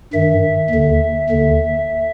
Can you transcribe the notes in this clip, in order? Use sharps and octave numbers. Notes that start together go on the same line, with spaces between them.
G2 D#3 E5
D#2 D3
D#2 D3